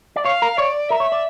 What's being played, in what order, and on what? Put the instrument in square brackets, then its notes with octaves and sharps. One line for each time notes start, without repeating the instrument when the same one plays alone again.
[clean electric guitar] D5
[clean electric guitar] C#5 [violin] F5
[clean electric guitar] A#4
[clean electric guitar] C#5 [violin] D5
[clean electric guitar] A#4 [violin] E5
[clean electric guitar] C#5
D5